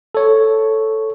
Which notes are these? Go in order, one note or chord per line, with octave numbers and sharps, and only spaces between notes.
A4 C#5